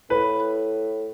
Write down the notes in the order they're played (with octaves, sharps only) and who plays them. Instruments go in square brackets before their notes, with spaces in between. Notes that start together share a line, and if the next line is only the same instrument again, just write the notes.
[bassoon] A2 [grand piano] B4